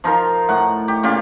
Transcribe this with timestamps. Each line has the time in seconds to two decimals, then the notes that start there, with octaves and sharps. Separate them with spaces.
0.04 F3 D#4 F4 A#4
0.49 A2 F#5
0.88 G4
1.03 A#2 C#3 F4 G4